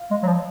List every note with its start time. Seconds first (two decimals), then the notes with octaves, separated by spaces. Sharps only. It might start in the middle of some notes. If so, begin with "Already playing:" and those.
Already playing: F5
0.11 G#3
0.23 F#3
0.27 F3